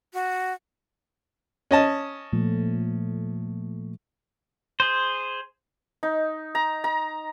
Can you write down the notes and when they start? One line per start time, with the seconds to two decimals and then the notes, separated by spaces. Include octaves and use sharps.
0.13 F#4
1.71 C#4 D#5 A5
2.33 A#2 F3 A3
4.80 G#4 C5
6.03 D#4
6.55 A#5
6.84 A#5